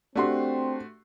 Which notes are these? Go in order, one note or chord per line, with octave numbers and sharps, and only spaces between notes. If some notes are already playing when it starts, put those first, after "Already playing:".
A3 C4 D4 F#4 G4 C6